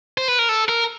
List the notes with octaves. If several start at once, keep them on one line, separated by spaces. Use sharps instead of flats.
C5
B4
A#4
A4
A#4